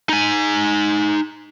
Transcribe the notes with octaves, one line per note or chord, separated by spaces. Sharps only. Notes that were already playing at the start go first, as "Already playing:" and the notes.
D#4 G#5